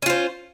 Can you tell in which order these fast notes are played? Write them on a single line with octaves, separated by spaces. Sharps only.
C#4 F4 C5